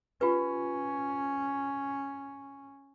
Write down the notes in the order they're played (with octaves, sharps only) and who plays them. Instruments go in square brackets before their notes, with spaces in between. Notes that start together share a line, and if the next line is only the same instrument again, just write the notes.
[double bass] C#4 [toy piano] F4 G4 B4